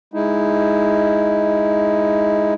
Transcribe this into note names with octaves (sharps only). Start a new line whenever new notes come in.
G#3 D#4 E4